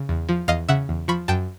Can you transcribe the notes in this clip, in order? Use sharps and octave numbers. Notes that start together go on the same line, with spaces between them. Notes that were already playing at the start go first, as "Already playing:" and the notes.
Already playing: C#3
E2
F3
E2 D#5 F5
C#3 E5 F#5
E2
F3 B5 C#6
F#2 G5 A5